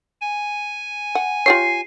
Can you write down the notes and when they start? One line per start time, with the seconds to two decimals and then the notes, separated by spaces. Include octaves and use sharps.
0.21 G#5
1.15 F#5
1.46 F4 G4 C#5 C7